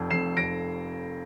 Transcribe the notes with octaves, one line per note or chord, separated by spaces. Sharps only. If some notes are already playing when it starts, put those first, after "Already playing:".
Already playing: F1 F2
F2 C7 E7
F1 A#6 D7